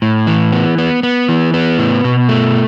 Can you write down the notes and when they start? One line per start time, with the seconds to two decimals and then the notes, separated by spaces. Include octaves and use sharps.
0.02 A2
0.27 E3
0.52 B3
0.78 B3
1.03 B3
1.29 E3
1.54 B3
1.79 A2
2.04 B2
2.29 A3